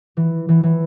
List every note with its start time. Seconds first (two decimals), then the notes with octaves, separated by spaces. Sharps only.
0.17 E3
0.49 E3
0.63 E3